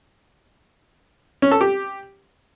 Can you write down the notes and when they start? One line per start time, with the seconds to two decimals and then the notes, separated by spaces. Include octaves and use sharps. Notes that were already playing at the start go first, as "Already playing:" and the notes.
1.42 C#4
1.52 A4
1.61 G4